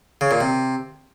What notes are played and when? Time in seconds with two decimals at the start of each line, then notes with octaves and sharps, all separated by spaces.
0.21 C#3
0.31 A#2
0.41 C3